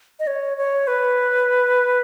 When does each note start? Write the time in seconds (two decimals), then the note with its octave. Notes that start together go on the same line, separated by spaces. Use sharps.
0.19 D#5
0.27 C#5
0.57 C#5
0.87 B4